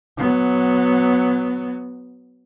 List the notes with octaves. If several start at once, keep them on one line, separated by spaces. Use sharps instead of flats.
F#3 B3